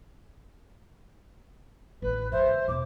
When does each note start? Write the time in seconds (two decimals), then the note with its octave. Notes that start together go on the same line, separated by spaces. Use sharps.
2.02 A1 D#3 B4
2.32 G2 D#3 C5 E5
2.47 C#3
2.68 E2 B2 D6